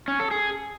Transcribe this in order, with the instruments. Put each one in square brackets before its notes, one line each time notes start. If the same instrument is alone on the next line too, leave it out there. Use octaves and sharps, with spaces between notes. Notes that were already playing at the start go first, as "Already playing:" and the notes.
[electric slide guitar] C#4
A4
G#4